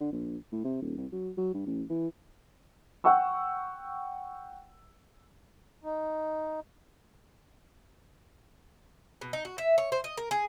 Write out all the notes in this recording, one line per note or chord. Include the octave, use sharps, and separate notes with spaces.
D3
A#1
A2
C3
D#1
C2
F#3
F#3
G2
A1
E3
F#5 G5 C#6 E6
D#4
B2
D#4
F#4
E5
C#5
C5
D#5
A#4
G#4